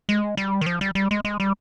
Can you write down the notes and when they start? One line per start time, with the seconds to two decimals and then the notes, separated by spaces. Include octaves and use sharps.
0.09 G#3
0.37 G3
0.61 D#3
0.66 F3
0.81 G3
0.95 G3
1.11 G#3
1.25 G#3
1.40 G3